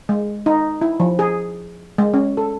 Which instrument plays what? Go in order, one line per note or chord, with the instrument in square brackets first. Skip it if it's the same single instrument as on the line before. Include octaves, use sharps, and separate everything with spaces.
[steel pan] G#3
D#4
E4
F3
G#4
G#3
C#4
A4